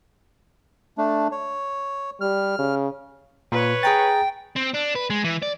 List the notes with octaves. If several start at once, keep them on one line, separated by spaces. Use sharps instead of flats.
A3 D4
C#5
G3 F6
C#3
A#2 B4 C#5
G#4 G5 A#5 A6
C4
D4
B4
G#3
E3
D5